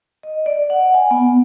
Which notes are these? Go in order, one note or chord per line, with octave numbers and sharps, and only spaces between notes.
D#5
D5
F#5
G#5
B3